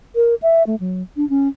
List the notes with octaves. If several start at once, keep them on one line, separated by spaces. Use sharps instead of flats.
A#4
E5
A3
F#3
D4
C#4